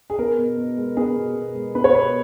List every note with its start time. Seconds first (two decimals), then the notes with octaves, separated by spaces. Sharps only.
0.10 G#4
0.19 B3 A#4
0.38 B2
0.57 B2
0.77 G#3
0.97 B3 G#4
1.16 B2
1.36 B2
1.55 G#3
1.75 B3 B4
1.84 C#5
1.94 B2 B4